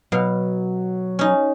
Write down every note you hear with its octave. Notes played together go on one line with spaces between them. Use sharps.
B2 F#3 F5
C#4 D#4